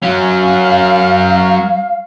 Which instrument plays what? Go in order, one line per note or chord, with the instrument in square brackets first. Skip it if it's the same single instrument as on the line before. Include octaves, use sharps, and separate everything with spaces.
[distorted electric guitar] F#3 C#4 [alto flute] F5